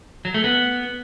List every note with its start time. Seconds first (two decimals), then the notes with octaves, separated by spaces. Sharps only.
0.25 F#3
0.34 A3
0.44 B3